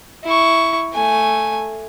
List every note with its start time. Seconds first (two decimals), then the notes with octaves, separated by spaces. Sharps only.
0.24 E4 C#6
0.94 A3 G#5